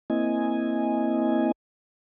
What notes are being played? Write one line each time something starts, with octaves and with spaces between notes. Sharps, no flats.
A#3 C4 E4 D#5 G#5